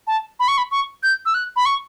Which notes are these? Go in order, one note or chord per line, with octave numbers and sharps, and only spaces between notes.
A5
B5
C#6
B5
C#6
G6
E6
F#6
B5
C#6